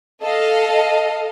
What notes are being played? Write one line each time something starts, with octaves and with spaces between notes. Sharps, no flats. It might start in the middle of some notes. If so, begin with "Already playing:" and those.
A4 D#5 F5